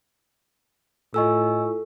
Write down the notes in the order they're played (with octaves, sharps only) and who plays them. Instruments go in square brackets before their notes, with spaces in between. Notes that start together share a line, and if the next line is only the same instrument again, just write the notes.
[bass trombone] A2 [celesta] E4 F4 C#6 [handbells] A4 [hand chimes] D#5 G#5 E6